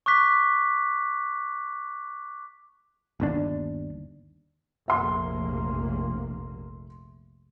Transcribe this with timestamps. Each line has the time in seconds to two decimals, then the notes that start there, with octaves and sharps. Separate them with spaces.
0.06 C#6 D6 F#6 B6
3.20 G1 D#2 D4
4.88 F1 A#1 A#3 E5 C6